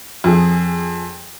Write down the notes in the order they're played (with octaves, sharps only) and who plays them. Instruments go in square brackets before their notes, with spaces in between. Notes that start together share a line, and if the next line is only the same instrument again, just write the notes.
[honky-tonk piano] F2 G#4